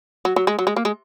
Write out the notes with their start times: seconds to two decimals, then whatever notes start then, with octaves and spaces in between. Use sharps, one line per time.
0.25 F#3
0.36 F#3
0.47 G#3
0.59 F#3
0.67 G#3
0.76 A#3
0.85 G#3